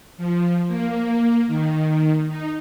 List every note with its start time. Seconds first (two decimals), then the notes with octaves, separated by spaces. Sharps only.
0.18 F3
0.68 A#3
1.48 D#3
2.28 D#4